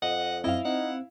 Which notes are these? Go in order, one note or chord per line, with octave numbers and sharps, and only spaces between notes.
F2 D#5 F#5
F#2 C4 E4 D#5 F5
C4 D#4 F#5